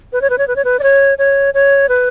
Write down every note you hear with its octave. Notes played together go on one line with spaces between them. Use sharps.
B4
C#5
B4
C#5
B4
C#5
B4
D5
C#5
C#5
C#5
B4